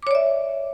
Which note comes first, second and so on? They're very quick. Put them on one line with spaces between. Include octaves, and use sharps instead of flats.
D6 C#5 D5 E5